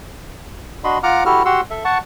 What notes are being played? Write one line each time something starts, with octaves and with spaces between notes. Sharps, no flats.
D4 F#4 D#5 B5 C6
F4 F#5 A#5 D6 F6
E4 F#4 G4 A4 F6
F#4 G4 F#5 C6 E6
A4 E5
F#5 A5 C#6